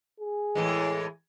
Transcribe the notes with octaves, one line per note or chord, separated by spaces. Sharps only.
G#4
A2 E3 G#3